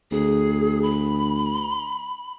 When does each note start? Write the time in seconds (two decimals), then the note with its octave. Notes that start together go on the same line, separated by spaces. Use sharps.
0.11 D2 G#4
0.83 B5